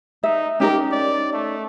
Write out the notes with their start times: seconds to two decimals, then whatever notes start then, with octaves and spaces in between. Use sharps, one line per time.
0.24 D#4 E5
0.60 C#4 D#4 G4 A#4
0.91 D5
1.33 A3